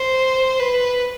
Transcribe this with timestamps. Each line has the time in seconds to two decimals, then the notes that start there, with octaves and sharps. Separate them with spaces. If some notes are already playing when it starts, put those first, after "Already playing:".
Already playing: C5
0.60 B4